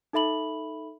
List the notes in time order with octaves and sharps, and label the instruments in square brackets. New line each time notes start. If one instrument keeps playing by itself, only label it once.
[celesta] D#4 A4 E5 B5 F#7